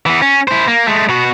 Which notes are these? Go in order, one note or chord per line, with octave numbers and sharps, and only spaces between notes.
E3 B3
C#4
E4 C5
A#3
G#3 A3
B2 F#4